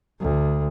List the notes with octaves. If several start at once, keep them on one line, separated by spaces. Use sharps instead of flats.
D2